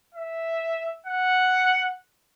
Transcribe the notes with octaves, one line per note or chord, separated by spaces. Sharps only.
E5
F#5